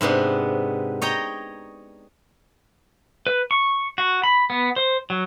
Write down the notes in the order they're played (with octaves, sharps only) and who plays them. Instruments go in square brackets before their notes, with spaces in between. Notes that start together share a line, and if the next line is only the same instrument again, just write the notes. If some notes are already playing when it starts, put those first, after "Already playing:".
[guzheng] G#2 C3 B3 D4
C#5 D#5 G5 A#5
[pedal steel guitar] B4
C#6
F#4
B5
B3
C5
F#3